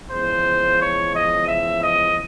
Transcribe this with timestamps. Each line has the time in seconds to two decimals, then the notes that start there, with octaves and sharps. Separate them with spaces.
0.11 E2 C#3 F3 G#3 C5
0.80 C#5
1.14 D#5
1.47 E5
1.82 D#5